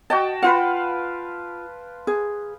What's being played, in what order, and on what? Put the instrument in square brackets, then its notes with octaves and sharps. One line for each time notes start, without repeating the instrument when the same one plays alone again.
[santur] F#4 G5 A5 [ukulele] D#5
[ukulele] F4 F#5 [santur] B4 C5 F5
[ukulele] G#4